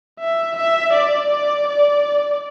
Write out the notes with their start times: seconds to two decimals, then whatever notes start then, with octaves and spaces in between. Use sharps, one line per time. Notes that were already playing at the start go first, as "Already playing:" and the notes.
0.20 E5
0.57 E5
0.93 D5
1.31 D5
1.68 D5